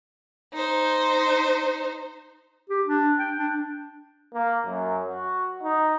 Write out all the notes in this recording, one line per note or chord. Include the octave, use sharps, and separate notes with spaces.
D#4 C5
G4
D4
G5
D4
A#3
F#2
F#4
D#4